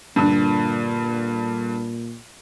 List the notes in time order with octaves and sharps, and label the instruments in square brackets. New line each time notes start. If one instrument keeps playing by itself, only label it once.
[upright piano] G2 D3 [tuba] A#2